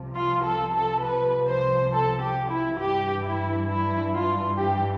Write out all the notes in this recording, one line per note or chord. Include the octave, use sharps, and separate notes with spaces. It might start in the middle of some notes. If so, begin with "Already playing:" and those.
Already playing: C2 C3 F3
F4
A4
A4
B4
C5
A4
G4
E4
G2 E3 G4
E4
E4
F4
G4